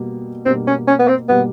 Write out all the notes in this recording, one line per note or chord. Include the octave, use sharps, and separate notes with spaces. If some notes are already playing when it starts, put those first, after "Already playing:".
Already playing: B2 G3 A#3
B2 G3 A#3 C4
C#4
C#4
B3
C4
B2 G3 A#3 B3